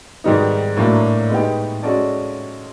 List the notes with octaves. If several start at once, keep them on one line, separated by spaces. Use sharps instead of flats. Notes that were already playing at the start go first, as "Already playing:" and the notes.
G#2 D#3 G3 B3 D#4
A2 F#3 A#3 D4
G#3 B3 D#4 G4
G#3 C#4 F#4 A4 D5